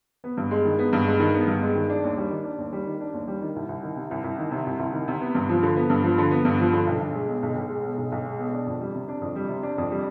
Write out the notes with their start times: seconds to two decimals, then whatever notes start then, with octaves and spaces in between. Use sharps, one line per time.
0.24 B3
0.37 G2
0.51 G#3
0.65 D#3
0.79 B3
0.93 G2
1.07 G#3
1.20 D#3
1.34 B3
1.48 G2
1.62 G#3
1.75 D#3
1.90 D4
2.04 D#2
2.18 G3
2.30 D#3
2.44 D4
2.58 D#2
2.73 G3
2.87 D#3
3.00 D4
3.14 D#2
3.28 G3
3.41 D#3
3.56 C2
3.68 C2
3.83 D#3
3.96 C3
4.11 C2
4.24 C2
4.38 D#3
4.51 C3
4.66 C2
4.79 C2
4.93 D#3
5.08 C3
5.21 B3
5.35 G2
5.49 F3
5.63 D3
5.76 B3
5.90 G2
6.04 F3
6.18 D3
6.31 B3
6.45 G2
6.59 F3
6.73 D3
6.87 B1
7.00 B1
7.15 G#3
7.28 B2
7.43 B1
7.56 B1
7.70 G#3
7.84 B2
7.97 B1
8.12 B1
8.25 G#3
8.39 B2
8.53 D4
8.67 F2
8.81 G3
8.95 C3
9.08 D4
9.21 F2
9.36 G3
9.49 C3
9.63 D4
9.78 F2
9.91 G3